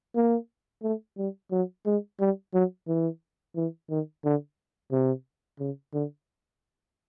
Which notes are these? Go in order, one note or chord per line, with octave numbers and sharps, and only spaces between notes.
A#3
A3
G3
F#3
G#3
G3
F#3
E3
E3
D#3
D3
C3
C#3
D3